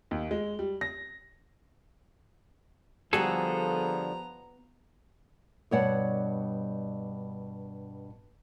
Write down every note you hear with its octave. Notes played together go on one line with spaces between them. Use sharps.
D#2
G#3
G3
A#6
D3 F3 G3 B3 F#4 G#4 A4 A#5
G2 B2 C#5 D5 F#5 A5